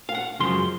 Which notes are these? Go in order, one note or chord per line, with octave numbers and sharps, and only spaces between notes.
F5
F#5
F#2 C#3 F3 G#3 C6